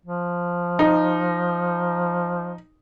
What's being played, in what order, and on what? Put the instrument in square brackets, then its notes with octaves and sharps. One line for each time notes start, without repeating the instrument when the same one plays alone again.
[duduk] F3
[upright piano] D#4